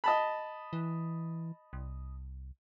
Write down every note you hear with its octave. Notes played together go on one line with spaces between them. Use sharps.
D#5 A5 B5
E3
C2